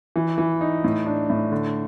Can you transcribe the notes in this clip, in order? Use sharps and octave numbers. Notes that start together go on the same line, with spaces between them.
E3
E3
D#4
A2
D4
A2
D3